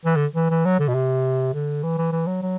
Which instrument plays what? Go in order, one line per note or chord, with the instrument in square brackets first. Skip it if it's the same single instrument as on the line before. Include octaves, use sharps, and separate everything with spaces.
[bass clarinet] E3
D3
E3
E3
F#3
D3
B2
C3
D3
E3
E3
E3
F#3
F#3